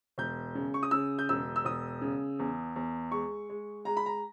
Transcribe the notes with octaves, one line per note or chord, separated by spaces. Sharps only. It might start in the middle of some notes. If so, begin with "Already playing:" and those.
E1 G6
C#3
C#6
D#6
C#3 E6
G6
E1 E6
E6
E1 D#6
C#3
E2
E2
G#3 C#6
G#3
G#3 A#5
B5
A#5